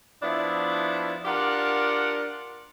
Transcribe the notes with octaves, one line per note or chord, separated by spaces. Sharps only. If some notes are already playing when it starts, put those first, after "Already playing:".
F3 B3 D4 E4
D4 F4 G4 A#4 F#5